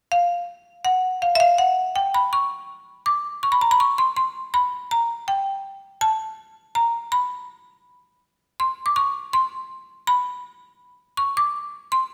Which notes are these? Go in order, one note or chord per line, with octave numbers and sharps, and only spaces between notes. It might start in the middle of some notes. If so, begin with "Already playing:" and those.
F5
F#5
F5
E5
F5
F#5
G5
B5
C#6
D6
C#6
B5
A#5
B5
C#6
C6
C6
B5
A#5
G5
A5
A#5
B5
C6
D6
C#6
C6
B5
C#6
D6
C6